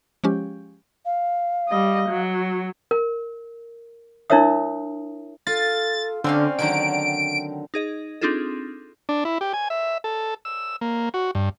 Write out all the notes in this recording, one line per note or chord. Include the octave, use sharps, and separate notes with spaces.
F3 G#3 C#4 G4
F5
G3 D#5
F#3
A#4
D4 E4 A#4 C#5 E5 D#6
F4 A4 A6
D3 C4 C#4 D5 F5
D3 D#3 F#3 D7
D#4 G#4 D#5
C4 D4 D#4 F4 G#4 A4
D4
E4
G4
G#5
E5
A4
E6
A#3
F#4
G2